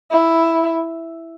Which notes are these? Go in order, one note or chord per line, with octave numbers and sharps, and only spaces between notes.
E4